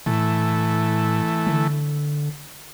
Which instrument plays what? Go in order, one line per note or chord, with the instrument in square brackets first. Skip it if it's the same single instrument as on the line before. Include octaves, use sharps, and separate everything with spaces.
[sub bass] A2 [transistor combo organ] E3 A3
[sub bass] D3